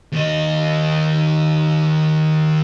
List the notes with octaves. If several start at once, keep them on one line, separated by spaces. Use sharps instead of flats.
D#2 D#5